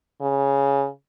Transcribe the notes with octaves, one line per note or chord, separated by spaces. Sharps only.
C#3